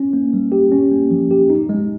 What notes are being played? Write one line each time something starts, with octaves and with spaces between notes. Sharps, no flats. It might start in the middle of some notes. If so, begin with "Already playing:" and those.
Already playing: C#4
A#3
G3
G4
C#4
A#3
F3
G4
D#4
G#3